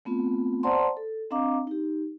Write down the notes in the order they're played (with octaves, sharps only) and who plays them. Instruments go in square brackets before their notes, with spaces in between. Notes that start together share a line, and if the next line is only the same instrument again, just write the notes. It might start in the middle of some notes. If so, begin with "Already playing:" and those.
[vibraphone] A3 B3 C4 F4
C5 D5 F#5 A5 A#5 C6
A4
C4 D4 D#5 F5 A#5 D6
D#4 G4